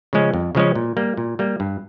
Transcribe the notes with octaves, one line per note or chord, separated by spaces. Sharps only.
C#3 F3 G#3 C#4
F2
C#3 F3 G#3 C#4
A#2
G3 A#3
A#2
G3 A#3
G2